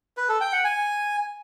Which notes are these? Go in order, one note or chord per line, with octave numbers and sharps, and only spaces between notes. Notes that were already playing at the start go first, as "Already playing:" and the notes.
B4
A4
G5
F#5
G#5